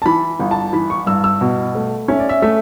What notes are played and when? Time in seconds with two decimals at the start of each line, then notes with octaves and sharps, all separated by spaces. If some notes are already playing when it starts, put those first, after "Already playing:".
0.02 A5
0.06 E3 B5
0.40 G1
0.51 A5
0.73 E3 B5
0.90 C#6
1.07 G2 E6
1.24 E6
1.41 B2
1.75 A3
2.08 C#4 E5
2.19 D5
2.29 E5
2.42 A3 E5